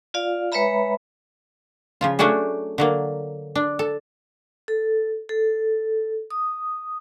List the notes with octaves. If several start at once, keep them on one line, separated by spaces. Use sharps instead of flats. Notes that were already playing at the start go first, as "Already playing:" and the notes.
F4 D5 F5
G#3 B4 C#5 E5 A#5 B5
C#3 F3 F4
F#3 A3 C#4 D4 F#4 G#4
D3 F#3 A#3
D4
A4
A4
A4
D#6